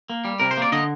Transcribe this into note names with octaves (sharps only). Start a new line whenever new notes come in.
A#3
G3
C3 A#4
C5
A#3 D5
D3 D#5